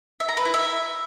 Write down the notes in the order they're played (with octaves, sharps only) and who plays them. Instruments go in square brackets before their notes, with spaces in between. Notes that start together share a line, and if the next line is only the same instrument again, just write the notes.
[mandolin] E5
A#5
B4
E4
E5